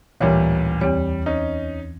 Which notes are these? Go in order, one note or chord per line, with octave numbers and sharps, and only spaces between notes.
A1 D2 A#2 E3 G3 C#5
E2 G3 C4 C#5
C#4 D#4